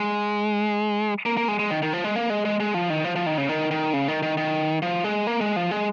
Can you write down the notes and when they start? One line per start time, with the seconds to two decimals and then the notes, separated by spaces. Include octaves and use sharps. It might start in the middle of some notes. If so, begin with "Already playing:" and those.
Already playing: G#3
1.26 A#3
1.37 A#3
1.48 G#3
1.59 G#3
1.71 D#3
1.82 D#3
1.93 F3
2.04 G#3
2.16 A#3
2.30 G#3
2.45 G#3
2.60 G#3
2.74 F3
2.90 D#3
3.04 F3
3.16 F3
3.26 D#3
3.38 C#3
3.49 D#3
3.71 D#3
3.93 C#3
4.08 D#3
4.23 D#3
4.37 D#3
4.82 F3
5.04 G#3
5.27 A#3
5.41 G#3
5.56 F3
5.71 G#3